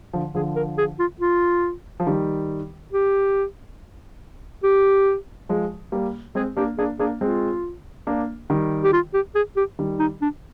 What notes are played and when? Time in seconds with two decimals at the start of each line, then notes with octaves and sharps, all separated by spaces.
0.13 D3 F3
0.35 D3 F3 G#4
0.56 A#4
0.78 G#4
0.99 F4
1.21 F4
2.00 F3
2.07 D#3 G3
2.93 G4
4.64 G4
5.49 F3 G#3
5.92 G3 A#3
6.35 G#3 C4 G#4
6.57 A#3 D4 G4
6.78 A#3 D4 G#4
6.99 A#3 D4 G#4
7.21 G#3 C4 F4
8.07 A#3 D4
8.50 D#3 G3
8.84 G4
8.93 F4
9.14 G4
9.35 G#4
9.57 G4
9.79 D#3 G3
10.00 D#4
10.22 D4